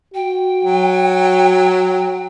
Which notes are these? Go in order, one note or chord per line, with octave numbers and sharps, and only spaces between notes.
F#4 G5
F#3